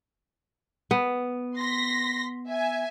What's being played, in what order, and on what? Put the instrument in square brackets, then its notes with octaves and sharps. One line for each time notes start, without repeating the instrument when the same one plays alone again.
[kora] B3
[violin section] C6 A#6 B6
E5 G#5